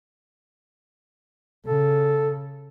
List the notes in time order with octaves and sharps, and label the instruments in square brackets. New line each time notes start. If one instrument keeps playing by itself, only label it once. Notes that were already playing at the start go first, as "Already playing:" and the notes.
[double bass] C#3 [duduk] A4